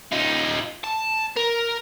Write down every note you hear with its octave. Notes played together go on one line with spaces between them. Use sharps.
D#4 F4
A5
A#4